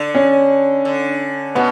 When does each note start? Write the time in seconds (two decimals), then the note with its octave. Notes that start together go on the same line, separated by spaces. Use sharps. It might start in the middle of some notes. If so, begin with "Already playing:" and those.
Already playing: D3
0.15 C#4
0.85 D3
1.55 B2 B3